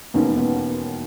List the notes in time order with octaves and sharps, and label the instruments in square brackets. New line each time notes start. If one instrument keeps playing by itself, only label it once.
[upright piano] E1 D#2 D#3 G#3 C#4 [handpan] B3
[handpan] B3